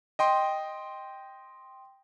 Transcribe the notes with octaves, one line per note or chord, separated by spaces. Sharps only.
D#5 G5 C6